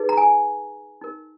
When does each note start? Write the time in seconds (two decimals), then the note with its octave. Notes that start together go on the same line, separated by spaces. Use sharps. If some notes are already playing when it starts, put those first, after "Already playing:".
Already playing: D#4 G#4 B4
0.09 A#5
0.17 G#5
1.01 D#4 A#4